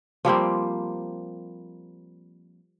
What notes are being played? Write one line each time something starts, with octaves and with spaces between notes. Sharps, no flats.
F3 G3 A#3 C4